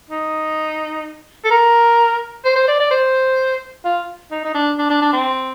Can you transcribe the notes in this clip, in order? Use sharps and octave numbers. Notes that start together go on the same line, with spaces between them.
D#4
A4
A#4
C5
C5
D5
D5
C5
F4
D#4
D#4
D4
D4
D4
D4
C4